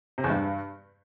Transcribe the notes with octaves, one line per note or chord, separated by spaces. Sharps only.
C3
E2
G2